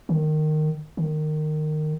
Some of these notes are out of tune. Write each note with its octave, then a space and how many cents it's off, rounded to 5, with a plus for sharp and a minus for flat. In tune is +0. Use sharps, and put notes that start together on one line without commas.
D#3 -15
D#3 -20